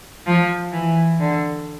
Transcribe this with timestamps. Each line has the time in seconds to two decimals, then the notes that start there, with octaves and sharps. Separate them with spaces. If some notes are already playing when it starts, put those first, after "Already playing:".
0.26 F3
0.73 E3
1.20 D3